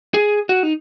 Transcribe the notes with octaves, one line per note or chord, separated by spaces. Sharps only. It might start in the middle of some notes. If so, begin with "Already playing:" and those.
G#4
F#4
D#4